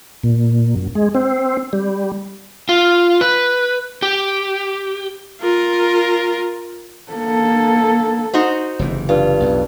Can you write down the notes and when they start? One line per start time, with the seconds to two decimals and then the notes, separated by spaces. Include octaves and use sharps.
0.23 A#2
0.76 F#2
0.95 G#3
1.15 C4
1.73 G3
2.69 F4
3.21 B4
4.02 G4
5.41 F4 A#4
7.13 A#3 A4
8.34 D#4 F#4 C5
8.79 F#1 C3 E3
9.09 G2 F4
9.40 B1 F2